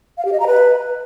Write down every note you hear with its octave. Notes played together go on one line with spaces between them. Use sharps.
F5
G4
D#5
A#5
B4